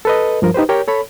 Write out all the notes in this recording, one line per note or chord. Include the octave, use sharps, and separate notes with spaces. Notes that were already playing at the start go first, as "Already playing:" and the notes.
A4 B4 D#5
G2 F3 A#4
D#4 G4 B4 C5
G4 A#4 C#5 G5
A4 C#5 B5